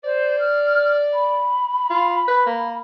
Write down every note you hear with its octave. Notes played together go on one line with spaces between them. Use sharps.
C5 D5
F6
B5
F4
B4
A#3